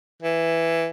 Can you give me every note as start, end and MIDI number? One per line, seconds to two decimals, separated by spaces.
0.22 0.88 52